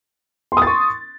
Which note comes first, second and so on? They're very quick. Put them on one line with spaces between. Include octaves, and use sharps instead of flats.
C6 D#6 A6 C#6